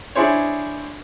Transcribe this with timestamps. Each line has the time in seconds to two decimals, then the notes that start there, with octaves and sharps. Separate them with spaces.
0.15 D4 E4 G#4 C5 C#5